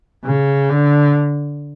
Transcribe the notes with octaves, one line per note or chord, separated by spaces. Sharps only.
C#3
D3